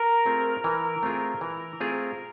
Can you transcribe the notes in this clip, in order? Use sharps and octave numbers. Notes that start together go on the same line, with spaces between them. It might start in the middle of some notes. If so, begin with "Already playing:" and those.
Already playing: A#4
A3 C4 F4 G#4
E3
A3 C4 F4 G#4
E3
A3 C4 F4 G#4